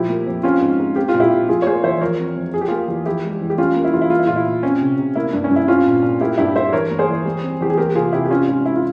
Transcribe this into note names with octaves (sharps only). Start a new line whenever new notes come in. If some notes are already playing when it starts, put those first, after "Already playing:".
Already playing: A#2 F3 E4 G4
A#3
F2
C4 C#4 F4
G#2
G#2
C4 G4
F4
A#2
E4 G4
A#2
F3 F4 G#4
C#5
A#3 G#4 C5
E2 C5 E5
F3 A#4 C#5
C4
F2
F3 G#4
G4
A#3 F4 G#4
E2
F3 E4 G4
G#3
E2
G4
G3 C#4 F4
A#3
E4
E2 F4
E4
A#3 F4
E4
A#2 F4
E4
A#2
C4 C#4
C3
C3
A#3 E4
G2
C#4
G2
E4
C4 C#4 F4
A#2
A#2
A#3 E4 G4
G2 E4 G4
G2 C5 E5
E3 A#4 C#5
A#3
G#4 C5
E2
G3
C4
E2 G4
G#4
A#3 G4 A#4
C3 F4 G#4
C3 E4 G4
G4
C4 C#4 F4
G#2 C#4 F4
G#2 E4
F4